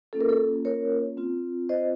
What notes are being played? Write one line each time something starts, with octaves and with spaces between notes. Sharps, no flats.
A#3 C#4 F4 A4
A#4
A4
A#4 C#5
C4 F4
C5 D#5